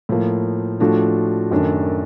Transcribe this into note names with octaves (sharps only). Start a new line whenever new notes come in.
A2 F3 A#3
A2 F3 A3 D4 F#4
F#2 D#3 F#3 A3 D4